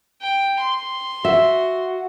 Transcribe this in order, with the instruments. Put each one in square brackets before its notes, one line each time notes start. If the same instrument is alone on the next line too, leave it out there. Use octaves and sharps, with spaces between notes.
[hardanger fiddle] G5
C6
[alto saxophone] F#4 [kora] E5